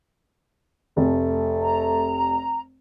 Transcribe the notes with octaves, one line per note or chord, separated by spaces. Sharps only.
F1 A3
A#5